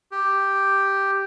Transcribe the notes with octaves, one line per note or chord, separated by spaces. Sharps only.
G4